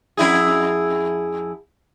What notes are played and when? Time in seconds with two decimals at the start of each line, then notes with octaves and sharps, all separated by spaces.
0.17 F2 E4 G#4